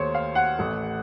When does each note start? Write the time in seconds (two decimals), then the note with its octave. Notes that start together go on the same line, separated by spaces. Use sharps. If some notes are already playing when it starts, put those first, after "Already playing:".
Already playing: D#2 D#3 A3 C5 C#5
0.14 F5
0.35 F#5
0.58 A1 A2 A3